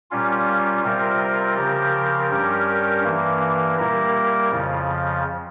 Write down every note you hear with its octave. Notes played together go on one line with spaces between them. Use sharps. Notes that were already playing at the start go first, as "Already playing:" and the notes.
A#2 G3 C#4 F4
C3 G3 C4 F4 A#4
C#3 F3 C4 G4 A#4
G2 G3 C#4 G4 A#4
G2 E3 A#3
A#2 G3 A#3 E4 A#4
F2 C#3 F3